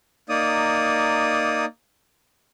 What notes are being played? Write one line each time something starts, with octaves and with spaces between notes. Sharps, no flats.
A#3 D#4 D5 D#6